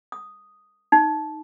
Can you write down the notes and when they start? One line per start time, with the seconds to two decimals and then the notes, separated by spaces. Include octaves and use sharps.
0.12 D#6
0.92 D#4